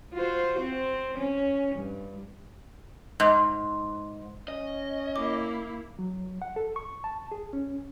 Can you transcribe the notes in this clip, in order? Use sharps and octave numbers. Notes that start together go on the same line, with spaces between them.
F4 F#4 C5
C4
C#4
G2
G#2
C#4 D#5
A#3 E4 D6
F#3
F#5
A4
C#6
A5
G#4
C#4